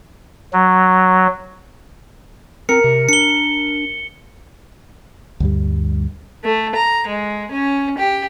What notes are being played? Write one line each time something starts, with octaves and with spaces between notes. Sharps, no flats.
F#3
C4 A#4 C#7
C3
D4 C#7 G7
D2 G2 G3
A3
A#5
G#3
C#4
G4